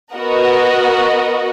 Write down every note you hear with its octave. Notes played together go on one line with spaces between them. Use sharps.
B3 F#4 A#4 D#5 F#5